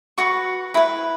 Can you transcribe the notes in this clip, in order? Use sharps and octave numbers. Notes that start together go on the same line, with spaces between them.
F#4 B4 C#6
E4 B4 B5